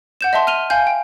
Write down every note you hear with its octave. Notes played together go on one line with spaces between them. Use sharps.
F#5 G6 E7
D#5 E5 A5 C6
F6 D#7 F7 G7
F5 G#5 G6
G5